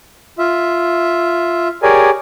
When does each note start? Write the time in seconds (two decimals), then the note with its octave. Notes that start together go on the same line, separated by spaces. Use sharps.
0.39 F4 E5
1.83 G4 G#4 A#4 C#5 D5 G#5